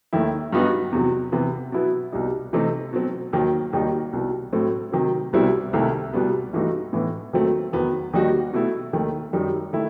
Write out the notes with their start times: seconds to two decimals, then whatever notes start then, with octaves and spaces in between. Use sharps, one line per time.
0.13 D#2 D#3 A3 E4
0.53 G2 F#3 B3 D#4 F#4
0.92 E2 C3 F#3
1.32 C3 E3 B3
1.72 B2 F#3 B3 E4
2.12 C2 B2 G3 D#4
2.53 C3 E3 A3 C4 D#4
2.93 B2 F#3 C4
3.33 D#2 D#3 F#3
3.73 D#2 D#3 G3 D#4 F#4
4.13 C2 B2 G3
4.52 A2 F#3 A3 C4
4.92 C3 D#3 F#3
5.33 C2 B2 G3 C4 E4
5.73 C2 C3 D#3 A3 E4
6.13 C2 B2 G3 B3
6.53 G2 E3 A3 D#4 F#4
6.93 A2 E3 B3
7.33 D#2 D#3 F#3 A3 C4
7.73 E2 D#3 F#3 B3
8.13 D#2 D#3 G3 D#4 F#4
8.53 B2 A3 E4
8.93 D#2 D#3 A3
9.33 F#2 D#3 G3 D#4
9.73 D#3 A3 E4